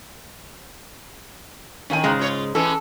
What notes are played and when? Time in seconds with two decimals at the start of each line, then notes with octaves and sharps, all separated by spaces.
1.90 A2 D#3 C#4 F5 G#5
2.04 G#2 C#3 G#3
2.19 F4 C#5
2.55 E3 G#3 C#4 A4